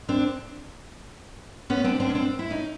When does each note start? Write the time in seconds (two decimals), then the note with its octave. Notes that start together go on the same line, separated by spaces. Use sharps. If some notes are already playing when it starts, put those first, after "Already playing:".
0.09 C4 D4
1.70 B3 C#4
1.84 C4 D4
2.00 C4 D4
2.10 C#4
2.15 C4 D4
2.39 E4
2.50 C#4 D#4